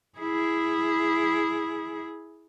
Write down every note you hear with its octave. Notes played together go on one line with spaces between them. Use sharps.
E4 G#4